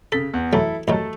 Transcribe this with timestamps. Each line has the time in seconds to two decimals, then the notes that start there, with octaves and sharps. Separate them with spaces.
0.12 C#3 A4 B6
0.34 E2
0.53 E3 F#3 A3 E4 A4
0.88 A1 D#3 F#3 A3 A4